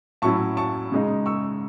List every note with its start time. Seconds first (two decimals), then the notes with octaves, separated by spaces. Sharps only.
0.22 A2 F#3 C#4 E4 A5 C#6
0.57 A5 C#6
0.92 C#3 G#3 D#4
1.26 C#6 E6